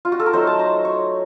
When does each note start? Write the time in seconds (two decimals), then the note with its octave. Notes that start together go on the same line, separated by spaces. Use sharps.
0.05 F4
0.12 F#4
0.20 A4
0.26 A#4
0.33 F#3 A3 D#4 C5
0.47 A5
0.59 A#5
0.85 C#5